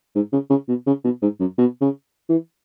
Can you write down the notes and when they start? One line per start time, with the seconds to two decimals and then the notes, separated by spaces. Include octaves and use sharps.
0.15 G#2
0.33 C#3
0.50 C#3
0.68 B2
0.86 C#3
1.04 B2
1.22 G#2
1.40 F#2
1.58 B2
1.81 C#3
2.29 E3